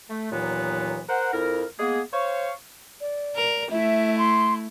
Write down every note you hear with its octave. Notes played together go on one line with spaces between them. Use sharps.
A3
D#2 A#2 E3 F#3 B3
A#4 C5 F#5
F2 E4 A#4
G#3 A#3 B3 G#4
C5 C#5 F5 C#6
D5
A#4
A3 E4 E5
C6